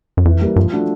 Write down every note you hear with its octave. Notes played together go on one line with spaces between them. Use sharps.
F#2
F2 E3
G3 A#3
G2 F3
A3 D4 F#4